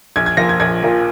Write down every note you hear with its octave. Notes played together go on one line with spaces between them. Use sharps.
A#1 G#6
G#6
A#2 F3 A#3 F4 A#6
G#6
A#1 G#6
A#2 F3 A#3 F4